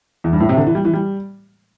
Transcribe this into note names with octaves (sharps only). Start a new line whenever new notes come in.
E2
G2
A2
C3
D3
E3
G3
E3
G3